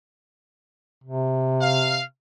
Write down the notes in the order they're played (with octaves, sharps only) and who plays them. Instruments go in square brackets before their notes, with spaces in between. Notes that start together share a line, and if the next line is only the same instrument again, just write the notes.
[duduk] C3
[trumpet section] F5